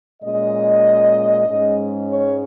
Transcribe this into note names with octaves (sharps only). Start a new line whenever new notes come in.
A#2 G#3 C#4 D#5
G#2 G#3 C#4
C#5